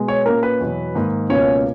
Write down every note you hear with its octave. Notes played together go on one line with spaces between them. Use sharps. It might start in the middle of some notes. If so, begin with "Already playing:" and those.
Already playing: B2 G#3
C#5
A#2 A#3 C#4 A#4
B4
E2 B2 F#3
G#2 D#3 A#3
C#2 B2 A#3 C#4 C#5